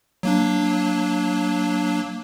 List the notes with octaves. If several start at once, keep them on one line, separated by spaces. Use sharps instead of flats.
F#3 A#3 D4